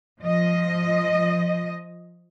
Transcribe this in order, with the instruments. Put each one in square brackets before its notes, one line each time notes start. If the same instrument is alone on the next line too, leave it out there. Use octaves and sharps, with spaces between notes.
[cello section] F3 D#5